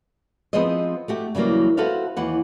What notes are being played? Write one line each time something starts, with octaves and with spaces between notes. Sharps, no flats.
F3 B3 C4 G#4 C5 D#5
A3 F#4 G4
C#3 E3 F#3 G3 A#3
F#4 A4 B4 C5 E5 F5
D#2 E3 F#5